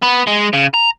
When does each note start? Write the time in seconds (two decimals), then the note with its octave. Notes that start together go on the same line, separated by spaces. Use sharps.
0.03 B3
0.27 G#3
0.53 C#3
0.74 A#5